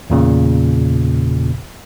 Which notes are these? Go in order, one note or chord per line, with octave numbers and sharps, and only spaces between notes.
E2 A#2 C#3